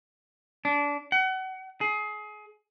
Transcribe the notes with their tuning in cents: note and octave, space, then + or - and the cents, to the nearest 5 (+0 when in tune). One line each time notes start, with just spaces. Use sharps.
D4 -25
F#5 +30
G#4 +25